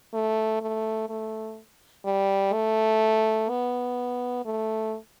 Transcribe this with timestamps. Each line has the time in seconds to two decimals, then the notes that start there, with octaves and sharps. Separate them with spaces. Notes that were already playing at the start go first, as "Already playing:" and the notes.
0.13 A3
0.62 A3
1.09 A3
2.05 G3
2.53 A3
3.50 B3
4.45 A3